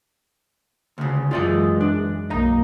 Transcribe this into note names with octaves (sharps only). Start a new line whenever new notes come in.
D2 C#3
F#2 E3 G#3 F4 D5 D#5
D4
B1 A#3 D#5 A#5